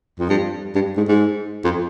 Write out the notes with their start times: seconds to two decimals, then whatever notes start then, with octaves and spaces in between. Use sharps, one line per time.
0.19 F2
0.29 G2
0.75 G2
0.97 G#2
1.08 G#2
1.64 F2